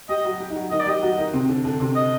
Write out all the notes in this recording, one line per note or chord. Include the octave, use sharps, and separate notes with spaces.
G3 G4 D#5
F#3 F#4
G3 G4
D#4
F#3 F#4
D#3 D#4 D#5
D5
G3 G4 D#5
F#3 F#4
D#3 D#4
C3 C4
D3 D4
D3 D4
C3 C4
D#5